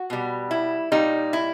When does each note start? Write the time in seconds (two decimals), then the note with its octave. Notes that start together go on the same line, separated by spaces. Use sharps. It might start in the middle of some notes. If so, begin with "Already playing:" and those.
Already playing: F#4
0.10 B2 G3
0.51 E4
0.92 A#2 G3 D#4
1.33 E4